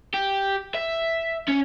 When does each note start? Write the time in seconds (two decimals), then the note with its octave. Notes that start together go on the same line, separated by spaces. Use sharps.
0.14 G4
0.74 E5
1.48 C#4